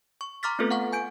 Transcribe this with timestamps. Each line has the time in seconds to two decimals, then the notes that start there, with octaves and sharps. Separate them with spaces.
0.21 C#6
0.43 A#5 C6 D6 F6 A6 B6
0.59 A3 B3 C4 F4 A4 B4
0.71 F5 F#5 C#6
0.93 G#5 G6 D7